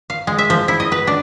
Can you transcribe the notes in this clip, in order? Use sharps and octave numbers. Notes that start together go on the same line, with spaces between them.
F5
G#3
E5
F3
E4
D#5
B4
D4